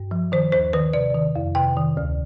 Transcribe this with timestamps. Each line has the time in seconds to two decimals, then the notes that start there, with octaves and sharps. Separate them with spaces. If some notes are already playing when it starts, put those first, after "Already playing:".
Already playing: G2
0.11 F3
0.32 D#3 C5
0.52 D#2 C5
0.73 D#3 B4
0.94 C3 D5
1.14 D#3
1.35 F2
1.55 C3 G5
1.77 D#3
1.97 D2